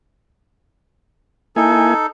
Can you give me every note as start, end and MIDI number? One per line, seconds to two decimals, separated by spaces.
1.56 1.94 58
1.56 2.06 63
1.56 1.94 64
1.56 2.06 69
1.56 1.94 80